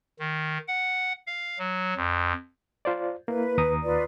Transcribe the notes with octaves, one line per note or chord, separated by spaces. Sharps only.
D#3
F#5
F5
F#3
F2
F4 C5 D5
A#3 E4 B4
D#2 A#5 D#6
F4 B4 D5